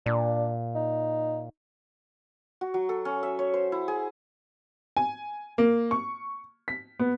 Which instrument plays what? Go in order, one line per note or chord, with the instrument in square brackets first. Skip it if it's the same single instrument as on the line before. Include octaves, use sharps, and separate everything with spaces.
[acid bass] A#2 [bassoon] D4
[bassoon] D#4
[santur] F#4
F#3
A4
C#4
E5
C#5
C5
E4
G#4
[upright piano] G#5
A#3
C#6
B6
B3